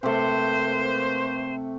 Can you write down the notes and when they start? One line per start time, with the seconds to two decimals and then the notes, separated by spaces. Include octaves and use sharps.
0.03 C3 A3 A#3 B4 C5